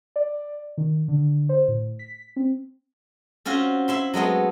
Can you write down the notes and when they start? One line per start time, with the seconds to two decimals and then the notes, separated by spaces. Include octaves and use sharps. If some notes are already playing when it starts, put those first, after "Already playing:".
0.16 D5
0.78 D#3
1.08 D3
1.49 C5
1.68 A2
1.99 B6
2.36 C4
3.45 C4 C#4 F4 F#4
3.88 E4 E5 C6
4.14 F#3 G#3 A3 B3